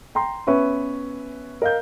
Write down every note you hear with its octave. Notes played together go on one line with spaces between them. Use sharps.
G5 A#5 C6
B3 C#4 B4 E5 C#6
A#4 D#5 F5 G6